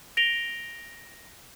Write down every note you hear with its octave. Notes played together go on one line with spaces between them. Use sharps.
A#6 D7 F7 G7